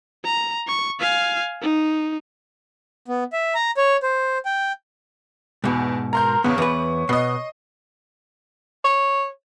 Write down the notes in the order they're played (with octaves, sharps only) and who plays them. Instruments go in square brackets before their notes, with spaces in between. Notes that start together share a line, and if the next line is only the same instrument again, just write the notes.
[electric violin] A#5
C#6
F5 G#5
D#4
[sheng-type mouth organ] B3
E5
A#5
C#5
C5
G5
[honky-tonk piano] E2 [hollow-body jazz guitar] G#2 B2
[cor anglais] A#4 [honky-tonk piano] A#5 C6 G6
[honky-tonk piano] E2 C#3 [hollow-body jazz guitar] B3 [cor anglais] C#5
[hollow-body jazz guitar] E2 B4 [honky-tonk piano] B3
[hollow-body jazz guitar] B2 B3 [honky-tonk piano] D#5 C7
[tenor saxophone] C#5